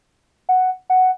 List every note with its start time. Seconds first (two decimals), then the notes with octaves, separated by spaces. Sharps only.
0.49 F#5
0.90 F#5